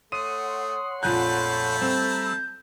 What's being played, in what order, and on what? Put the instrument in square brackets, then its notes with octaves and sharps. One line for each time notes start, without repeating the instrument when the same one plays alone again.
[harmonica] A3 [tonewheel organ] C#5 F#5 C6 [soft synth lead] D#6 [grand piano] D#7
[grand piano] A#1 F2 F#6 [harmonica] A3 A5 B5 [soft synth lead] G6
[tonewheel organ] G3 A#5 E6 [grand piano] C4